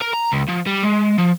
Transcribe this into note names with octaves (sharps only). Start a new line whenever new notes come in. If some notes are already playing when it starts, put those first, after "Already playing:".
A#4
A#5
C#2
F3
G3
G#3
F3